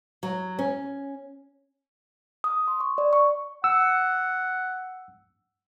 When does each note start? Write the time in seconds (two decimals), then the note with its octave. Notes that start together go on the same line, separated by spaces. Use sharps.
0.23 F#3
0.59 C#4
2.44 D#6
2.68 C6
2.80 C#6
2.98 D5
3.13 C#6
3.64 F#5 E6